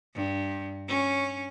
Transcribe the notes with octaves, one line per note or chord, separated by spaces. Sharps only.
G2
C#4